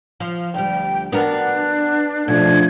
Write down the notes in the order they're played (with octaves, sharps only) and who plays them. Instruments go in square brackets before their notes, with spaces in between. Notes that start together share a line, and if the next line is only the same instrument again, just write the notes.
[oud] F3
[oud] D2 G3 [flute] G5
[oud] B3 F#4 A#4 [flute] D4
[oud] B2 [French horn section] F3 A3 D4 [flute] G#6